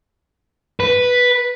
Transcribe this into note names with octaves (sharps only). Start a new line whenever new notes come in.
B4